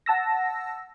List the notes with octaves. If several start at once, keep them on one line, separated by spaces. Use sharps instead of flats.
F#5 A5 E6 A#6